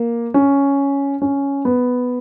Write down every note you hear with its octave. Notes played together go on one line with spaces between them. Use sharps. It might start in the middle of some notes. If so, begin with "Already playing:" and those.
Already playing: A#3
C#4
C#4
B3